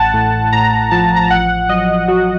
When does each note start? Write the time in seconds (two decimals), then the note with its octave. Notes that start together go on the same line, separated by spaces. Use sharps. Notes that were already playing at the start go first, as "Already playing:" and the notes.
Already playing: A1 F#5 A5
0.14 A2
0.52 A2 A#5
0.91 F3 A5
1.16 A#5
1.23 A5
1.30 A1 F#5
1.69 F#3 D#5
2.08 F#3 F#4